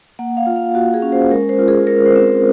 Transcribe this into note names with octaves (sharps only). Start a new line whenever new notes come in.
A#3 F#5
F5
F4
F5
A#3 F#4
G#4
C#4
C5
G#3 A#4
C5
F4
G#4
G#3 A#4
C5
C4